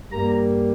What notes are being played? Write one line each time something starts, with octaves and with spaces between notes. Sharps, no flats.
G2 G3 A#3 A#5